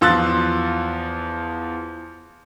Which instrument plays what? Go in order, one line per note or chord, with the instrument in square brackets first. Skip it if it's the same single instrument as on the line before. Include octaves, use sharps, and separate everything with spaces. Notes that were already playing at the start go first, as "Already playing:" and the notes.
[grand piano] E2 F3 C6 E6 F#6 A6